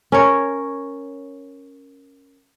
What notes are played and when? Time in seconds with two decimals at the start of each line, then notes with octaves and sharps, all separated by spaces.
0.12 C#4 A#4 C#5